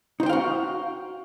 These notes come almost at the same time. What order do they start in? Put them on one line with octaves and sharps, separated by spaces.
D#4 C5 G5 F5 F#4